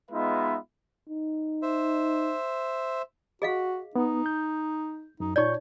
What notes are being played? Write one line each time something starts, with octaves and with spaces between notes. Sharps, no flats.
G#3 B3 D#4 F4 B4 E5
D#4
C5 E5
F#4 G#4 D#5 F5
B3 D#4
G6
F#2 D#4
A#2 D#4 C#5 D5 C#6 G6